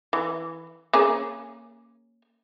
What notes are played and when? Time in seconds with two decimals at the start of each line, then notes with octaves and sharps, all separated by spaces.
0.13 E3
0.93 A#3 C#4 G#4